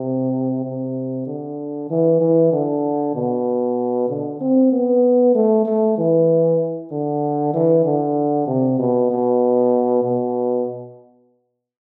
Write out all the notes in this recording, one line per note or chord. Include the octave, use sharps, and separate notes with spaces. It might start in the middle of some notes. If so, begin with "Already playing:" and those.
Already playing: C3
C3
D3
E3
E3
D3
B2
D3
C4
B3
A3
A3
E3
D3
E3
D3
C3
B2
B2
B2